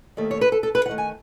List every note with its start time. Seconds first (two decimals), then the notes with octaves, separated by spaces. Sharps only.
0.17 D#2 D#3 A3
0.31 C#5
0.41 B4
0.52 A4
0.63 A4
0.75 B4
0.86 D#2 F#5
0.89 D#3 A3
0.98 G#5